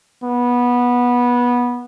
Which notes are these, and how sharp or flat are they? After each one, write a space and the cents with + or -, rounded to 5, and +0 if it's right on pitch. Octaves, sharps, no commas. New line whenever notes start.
B3 -15